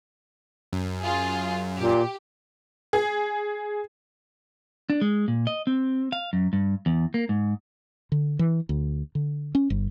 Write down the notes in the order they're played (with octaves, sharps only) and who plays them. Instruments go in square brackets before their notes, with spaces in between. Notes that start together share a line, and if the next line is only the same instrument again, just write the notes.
[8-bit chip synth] F#2
[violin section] F4 G#4
[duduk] A#2 [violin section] G4
[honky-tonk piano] G#4
[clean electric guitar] D4
G#3
A#2
D#5
C4
F5
F#2
G2
E2
A#3
G#2
[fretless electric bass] D3
E3
D2
D3
C#4
G1